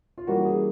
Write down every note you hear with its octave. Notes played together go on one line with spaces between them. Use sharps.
F4
E3 G3 A#3 C#4 F#4
G#4